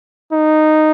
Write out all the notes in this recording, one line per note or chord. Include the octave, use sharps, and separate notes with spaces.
D#4